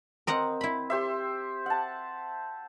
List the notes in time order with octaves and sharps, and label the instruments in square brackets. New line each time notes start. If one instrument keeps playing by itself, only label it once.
[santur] C4 [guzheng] A#4 D#5 F#5
[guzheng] E4 B5
[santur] G4 C5 E5
F#5 A5